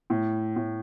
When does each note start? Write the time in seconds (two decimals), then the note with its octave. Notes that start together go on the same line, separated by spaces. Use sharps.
0.10 A2
0.56 A2